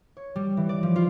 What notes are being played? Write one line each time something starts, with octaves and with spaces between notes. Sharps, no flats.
C#5
G3
E3
D5
F3
F4